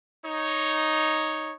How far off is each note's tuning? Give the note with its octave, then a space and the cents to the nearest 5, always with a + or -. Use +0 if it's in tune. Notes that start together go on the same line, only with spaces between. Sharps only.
D#4 +0 C#5 +0